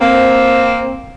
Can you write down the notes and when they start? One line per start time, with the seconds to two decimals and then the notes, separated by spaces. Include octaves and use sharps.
0.01 A#3 C4